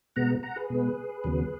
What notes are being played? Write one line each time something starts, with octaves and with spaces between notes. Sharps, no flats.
B2 G#3 B3 F#5 A#5
F#5 A#5
G#4 B4
B2 G#3 B3
D#2 C#3 F#3 B3